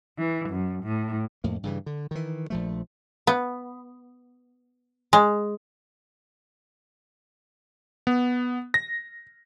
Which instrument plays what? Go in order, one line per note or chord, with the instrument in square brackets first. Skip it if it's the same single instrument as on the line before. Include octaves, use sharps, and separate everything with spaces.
[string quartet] E3
F#2
A2
[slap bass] F2 A2 A#3
G2 C#3 E3
D3
D#3 E3
A#1 F3 A3
[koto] B3
G#3
[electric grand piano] B3
A#6